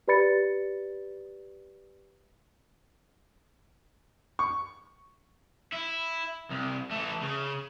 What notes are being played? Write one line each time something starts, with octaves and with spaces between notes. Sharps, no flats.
G4 B4 D5 B5 A6 C#7
C#6
E4
C2
E3 A3
C#3